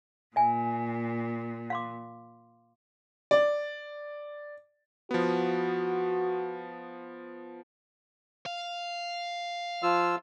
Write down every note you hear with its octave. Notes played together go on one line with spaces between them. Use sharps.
A#2 E5 G#5
F5 C6 D6
D5
F3 B3 F#4
F5
F3 F4 E6